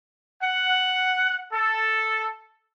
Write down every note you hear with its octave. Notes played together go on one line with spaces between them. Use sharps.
F#5
A4